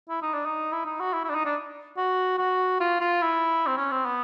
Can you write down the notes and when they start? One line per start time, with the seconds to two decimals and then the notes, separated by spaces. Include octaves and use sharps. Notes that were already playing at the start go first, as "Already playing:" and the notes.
0.09 E4
0.22 D#4
0.34 D4
0.46 D#4
0.72 E4
0.86 D#4
1.00 F#4
1.13 E4
1.24 E4
1.29 D4
1.34 D#4
1.45 D4
1.97 F#4
2.39 F#4
2.81 F4
3.01 F4
3.22 E4
3.67 C4
3.77 C#4
3.91 C4
4.06 B3